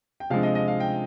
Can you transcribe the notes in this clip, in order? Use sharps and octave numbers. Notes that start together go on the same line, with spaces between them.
G5
C3 F3 G#3 D4 F5
D#5
D#5
F5
G5